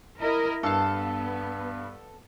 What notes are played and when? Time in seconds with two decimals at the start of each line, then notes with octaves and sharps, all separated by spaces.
0.20 E4 A#4 D#5
0.63 G2 B3 A4 F5